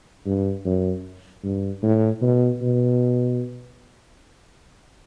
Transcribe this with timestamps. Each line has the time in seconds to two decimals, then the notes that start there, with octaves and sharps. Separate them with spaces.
0.26 G2
0.65 F#2
1.43 G2
1.82 A2
2.22 B2
2.62 B2